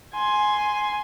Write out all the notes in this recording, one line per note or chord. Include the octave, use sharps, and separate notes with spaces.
G#5 C6